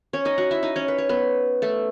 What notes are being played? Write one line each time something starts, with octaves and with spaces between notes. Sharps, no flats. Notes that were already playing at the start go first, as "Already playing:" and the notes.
C#4 C#5
D#4 D#5
F#4 F#5
E4 E5
D#4 D#5
C#4 C#5
B4
C#5
B3 B4
A3 A4